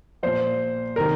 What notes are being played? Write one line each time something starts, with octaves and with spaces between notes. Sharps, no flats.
A#2 F3 C5
C3 D#3 A#4